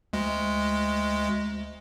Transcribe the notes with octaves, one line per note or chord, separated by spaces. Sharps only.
D2 G#3